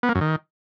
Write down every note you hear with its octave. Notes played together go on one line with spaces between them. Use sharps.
B3
A#3
F#2
D#3